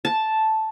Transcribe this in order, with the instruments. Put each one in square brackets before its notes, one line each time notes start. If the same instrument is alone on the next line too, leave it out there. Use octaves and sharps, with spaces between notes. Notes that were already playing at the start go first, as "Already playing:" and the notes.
[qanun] A5